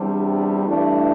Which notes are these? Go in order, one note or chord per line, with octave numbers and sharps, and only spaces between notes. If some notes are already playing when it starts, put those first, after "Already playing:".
Already playing: E2 C3 G3 D4
G2 E3 A3 D4